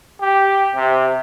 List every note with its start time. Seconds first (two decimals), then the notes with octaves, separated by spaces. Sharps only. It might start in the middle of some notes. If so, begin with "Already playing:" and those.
0.21 G4
0.76 C3